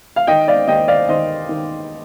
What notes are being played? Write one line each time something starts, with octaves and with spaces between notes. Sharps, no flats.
F5
D#3 D#5 G5
D5 F5
D#2 D#5 G5
D5 F5
D#3 C5 D#5
D#3